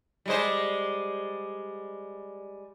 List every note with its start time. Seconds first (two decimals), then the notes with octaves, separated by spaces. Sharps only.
0.26 G3 G#3 C5